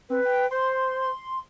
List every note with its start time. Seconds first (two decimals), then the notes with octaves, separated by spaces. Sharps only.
0.10 C4 B4
0.25 G5
0.51 C5 C6